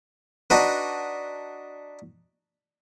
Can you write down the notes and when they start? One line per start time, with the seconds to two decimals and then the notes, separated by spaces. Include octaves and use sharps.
0.50 D4 D#4 F#4 B4